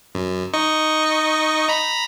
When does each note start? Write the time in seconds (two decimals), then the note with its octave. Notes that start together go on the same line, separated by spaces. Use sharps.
0.15 F#2
0.54 D#4 D#5 C#6
1.69 A#5 B5